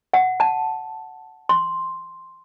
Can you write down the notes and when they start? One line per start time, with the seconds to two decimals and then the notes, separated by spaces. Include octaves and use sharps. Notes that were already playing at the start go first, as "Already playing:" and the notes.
0.14 F#5
0.40 A5
1.49 C6